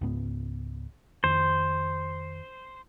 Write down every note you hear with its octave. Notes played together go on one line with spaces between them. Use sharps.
C#2 G#2 B3
F2 D#3 C5